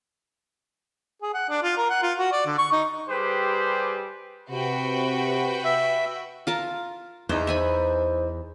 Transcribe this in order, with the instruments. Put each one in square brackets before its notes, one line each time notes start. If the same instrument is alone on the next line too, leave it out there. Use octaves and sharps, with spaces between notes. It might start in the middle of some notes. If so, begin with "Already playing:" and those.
[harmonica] G#4
F#5
D4
F4
A#4
F#5
F4
F#4
D5
D3
C#6
D#4
[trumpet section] G3 G4 G#4 B4 C5
[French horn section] C3 [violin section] F#4 B4 G5
[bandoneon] E5
[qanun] F4 A#4 A5
[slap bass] E2 [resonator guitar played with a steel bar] E3 D#4 [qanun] C5
[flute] C5 [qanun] E5 G#5 B5